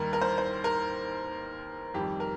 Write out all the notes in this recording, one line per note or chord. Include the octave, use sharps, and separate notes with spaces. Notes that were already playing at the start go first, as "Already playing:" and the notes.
Already playing: D#2 D#3 G3 A#4
A#4
C5
C5
A#4
F2 D#3 G3 G4
A#4